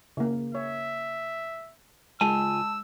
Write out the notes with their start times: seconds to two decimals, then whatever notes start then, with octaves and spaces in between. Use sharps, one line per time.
0.17 C#3 A#3
0.55 C#5 E5
2.21 C#2 G#3 F4 G#5 A5 E6